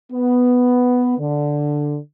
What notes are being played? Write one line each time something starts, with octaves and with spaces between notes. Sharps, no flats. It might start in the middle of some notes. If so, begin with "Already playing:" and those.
B3
D3